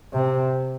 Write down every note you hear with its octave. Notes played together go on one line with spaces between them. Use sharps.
C3